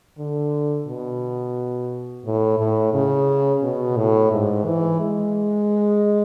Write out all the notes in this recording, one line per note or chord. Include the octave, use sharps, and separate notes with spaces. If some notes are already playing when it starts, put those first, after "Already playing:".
D3
B2
A2
A2
C#3
B2
A2
G#2
E3
G#3